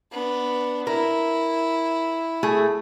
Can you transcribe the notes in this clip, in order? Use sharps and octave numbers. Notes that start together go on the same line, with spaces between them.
B3 D4
E4 A#4
A3 G#4